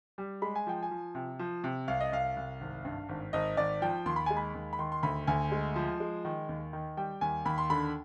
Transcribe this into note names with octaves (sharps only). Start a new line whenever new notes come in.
G3
G#3 B5
G#5
F3 G5
G#5
F3
C3
F3
C3
C2 F5
D#5
C2 F5
C2
G#1
G2
G#1
G#1 D#5
G#1 D5
F3 G5
D#2 C6
B5
G#3 G#5
B5
D#2
B5
D#3 C6
C6
D2 B5
D2 G#5
G#3
F3
G#3
D#3
D#2
D#3
G3 G5
D#2 G#5
D#2 B5
C6
D3 B5